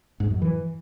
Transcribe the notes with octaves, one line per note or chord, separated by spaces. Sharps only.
G#2
F#2
E3